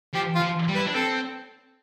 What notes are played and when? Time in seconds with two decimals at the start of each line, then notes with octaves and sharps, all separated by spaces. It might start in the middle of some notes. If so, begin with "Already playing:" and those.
0.15 F3 G4
0.35 F4
0.42 F3
0.69 G3
0.75 B4
0.78 E4
0.86 D4
0.95 C4 A4